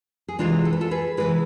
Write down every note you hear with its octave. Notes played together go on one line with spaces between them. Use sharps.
G#4
C3 E3 G#3 D4 F4
A4
B4
F4 A4
G#4 B4
C3 E3 G#3 G#4 B4